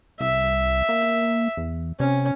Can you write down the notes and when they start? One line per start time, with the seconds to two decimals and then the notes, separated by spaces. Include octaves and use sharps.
0.20 C2 E5
0.89 A#3
1.57 E2
2.00 C3 C#4